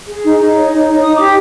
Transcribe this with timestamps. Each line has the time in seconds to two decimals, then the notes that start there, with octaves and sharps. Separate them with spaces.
0.08 G#4
0.25 D#4
0.40 D#4
0.56 C#5
0.71 D#4
0.87 D#4
1.02 D#4 D#6
1.16 G4 D6